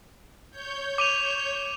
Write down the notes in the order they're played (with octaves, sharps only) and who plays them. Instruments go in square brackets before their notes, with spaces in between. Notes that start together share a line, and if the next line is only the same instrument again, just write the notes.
[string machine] C#5 G6
[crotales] D6 D#7 F7